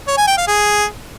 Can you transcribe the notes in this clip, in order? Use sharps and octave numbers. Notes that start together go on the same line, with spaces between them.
C#5
G#5
G5
F5
G#4